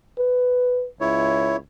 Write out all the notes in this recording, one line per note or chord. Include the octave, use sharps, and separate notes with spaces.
B4
C#2 E4 C#5